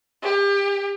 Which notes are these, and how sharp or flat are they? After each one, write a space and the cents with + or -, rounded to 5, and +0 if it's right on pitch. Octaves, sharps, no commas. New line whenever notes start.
G4 +35